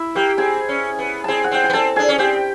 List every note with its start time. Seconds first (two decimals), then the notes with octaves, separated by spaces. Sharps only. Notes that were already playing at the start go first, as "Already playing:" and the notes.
Already playing: E4 E5
0.15 A#3 G4 G5
0.38 C4 G#4 G#5
0.69 C#4
0.98 B3
1.24 C4 G#4 G#5 A5
1.44 F#5
1.51 C4 G5
1.64 G#5
1.69 B3
1.73 C4 A4 A5
1.96 D4 G#4 G#5
2.08 C#4
2.18 C4 G4 G5